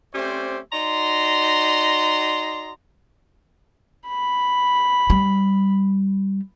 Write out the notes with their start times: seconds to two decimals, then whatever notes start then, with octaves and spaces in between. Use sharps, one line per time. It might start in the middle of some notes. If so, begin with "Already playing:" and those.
0.14 A3 C4 C#4 G4 C5 D5
0.72 D#4 F#4 D5 A#5 C6
4.08 B5
5.10 G3